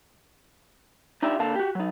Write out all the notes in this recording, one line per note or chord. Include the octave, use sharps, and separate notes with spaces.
D4 D#4 F4 G4 D5 E5
D3 A#3 A4 F5 A5
F#4 G4
F#3 D#4